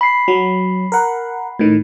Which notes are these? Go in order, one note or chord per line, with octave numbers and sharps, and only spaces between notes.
B5 C7
F#3
A#4 F#5
A2 D#3